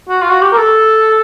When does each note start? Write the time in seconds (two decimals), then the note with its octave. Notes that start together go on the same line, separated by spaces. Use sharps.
0.09 F#4
0.22 F4
0.30 F#4
0.41 G4
0.52 A#4
0.58 A4